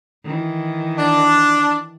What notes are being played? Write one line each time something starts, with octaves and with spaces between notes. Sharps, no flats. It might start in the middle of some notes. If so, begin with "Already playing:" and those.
D#3 E3
D4